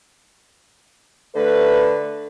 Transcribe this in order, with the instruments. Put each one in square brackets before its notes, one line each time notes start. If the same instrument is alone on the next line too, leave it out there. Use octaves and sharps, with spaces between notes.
[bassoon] D3 [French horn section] A3 B4